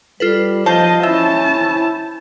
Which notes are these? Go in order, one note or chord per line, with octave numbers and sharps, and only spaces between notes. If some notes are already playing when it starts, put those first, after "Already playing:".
G3 F4 A4 B4
F3 F4 C5 D#5 A5 G6
C#4 E4 E5 A5